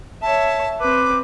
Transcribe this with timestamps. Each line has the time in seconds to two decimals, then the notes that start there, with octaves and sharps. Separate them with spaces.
0.22 C#5 E5 A5
0.80 C4 B4 D6